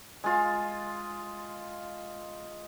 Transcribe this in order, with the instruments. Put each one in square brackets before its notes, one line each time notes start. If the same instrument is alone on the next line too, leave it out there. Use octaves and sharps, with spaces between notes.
[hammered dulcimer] G#3 F4 F5